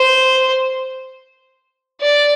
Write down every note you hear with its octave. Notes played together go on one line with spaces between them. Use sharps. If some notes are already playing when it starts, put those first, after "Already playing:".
Already playing: C5
D5